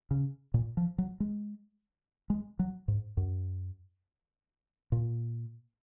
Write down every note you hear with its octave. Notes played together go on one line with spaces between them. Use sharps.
C#3
A#2
F3
F#3
G#3
G#3
F#3
G#2
F#2
A#2